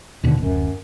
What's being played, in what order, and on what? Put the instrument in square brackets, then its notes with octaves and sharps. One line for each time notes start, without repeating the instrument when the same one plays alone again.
[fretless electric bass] D#2 B2 D3
[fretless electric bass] D1 [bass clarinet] F#2